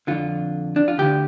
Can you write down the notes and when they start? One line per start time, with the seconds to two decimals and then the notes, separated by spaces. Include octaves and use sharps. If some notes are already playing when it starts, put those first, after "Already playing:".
0.07 F2 D3 F4
0.76 D4
0.88 F4
0.98 D2 D3 G4